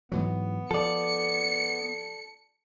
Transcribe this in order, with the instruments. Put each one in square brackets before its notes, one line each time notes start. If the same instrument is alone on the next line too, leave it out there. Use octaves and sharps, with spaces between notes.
[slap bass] G#2 E3 F#3 [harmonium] B3
[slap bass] F3 [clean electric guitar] A4 D5 [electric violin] C#7